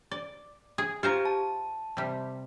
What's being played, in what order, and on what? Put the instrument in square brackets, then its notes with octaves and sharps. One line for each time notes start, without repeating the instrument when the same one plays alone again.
[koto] D5
G#4
[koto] F4 C5 A#5 [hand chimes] G4
[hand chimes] A5
[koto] C3 G3